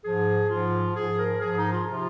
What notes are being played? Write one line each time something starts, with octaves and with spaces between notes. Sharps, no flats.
G#2 F3 G#4
G#2 F3 F4
G#2 F3 G#4
A#4
G#2 F3 G#4
D#4
F4
C3 F3 F4